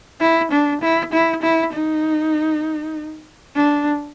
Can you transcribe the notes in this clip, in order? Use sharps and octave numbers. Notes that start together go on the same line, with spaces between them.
E4
D4
E4
E4
E4
D#4
D4